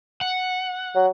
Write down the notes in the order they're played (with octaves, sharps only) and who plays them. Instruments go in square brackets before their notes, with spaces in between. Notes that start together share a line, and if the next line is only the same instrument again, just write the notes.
[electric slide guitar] F#5
[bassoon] F#3